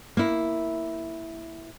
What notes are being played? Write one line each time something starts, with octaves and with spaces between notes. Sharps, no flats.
A#3 E4